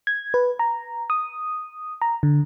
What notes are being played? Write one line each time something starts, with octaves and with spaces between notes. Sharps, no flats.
G#6
B4
A#5
D#6
A#5
D3